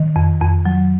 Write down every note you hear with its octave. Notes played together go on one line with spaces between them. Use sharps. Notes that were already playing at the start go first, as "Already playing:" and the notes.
Already playing: D#3
F2
F2
F#3